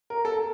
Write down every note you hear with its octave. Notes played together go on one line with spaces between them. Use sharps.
A#4
A4